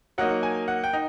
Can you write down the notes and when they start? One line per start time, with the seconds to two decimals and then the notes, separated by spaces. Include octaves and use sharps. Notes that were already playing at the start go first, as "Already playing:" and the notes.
0.18 F#3 A#3 D#4 F#5
0.43 G#5
0.68 F#5
0.84 G5
0.93 D#4